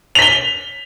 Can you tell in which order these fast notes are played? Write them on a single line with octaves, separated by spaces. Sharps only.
F7 B6 G7